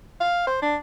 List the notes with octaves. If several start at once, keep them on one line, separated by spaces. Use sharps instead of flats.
F5
C5
D4